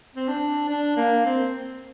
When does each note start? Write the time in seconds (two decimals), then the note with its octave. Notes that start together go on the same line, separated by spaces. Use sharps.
0.16 C4
0.28 D4
0.69 D4
0.97 A#3
1.25 C4